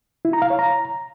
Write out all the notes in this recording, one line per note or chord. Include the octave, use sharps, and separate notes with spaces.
E4
A#5
F5
C#5
A#5